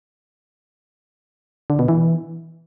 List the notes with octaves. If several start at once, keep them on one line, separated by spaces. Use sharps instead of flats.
D3
B2
E3